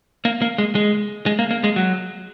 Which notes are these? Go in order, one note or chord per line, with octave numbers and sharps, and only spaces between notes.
A#3
A#3
G#3
G#3
G#3
A#3
A#3
G#3
F#3